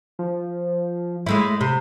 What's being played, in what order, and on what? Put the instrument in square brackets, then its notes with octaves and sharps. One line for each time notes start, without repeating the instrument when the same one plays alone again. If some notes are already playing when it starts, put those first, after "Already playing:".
[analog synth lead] F3
[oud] G#3 A3 E4 [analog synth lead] B5
[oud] C3